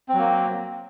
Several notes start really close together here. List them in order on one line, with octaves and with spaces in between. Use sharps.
C4 F#3 A#3